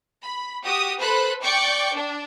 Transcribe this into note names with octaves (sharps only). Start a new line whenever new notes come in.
B5
F#4 G4 D#6
A4 B4 C5 B5 F#6
D5 G5 C#6 D6 G6 C#7
D4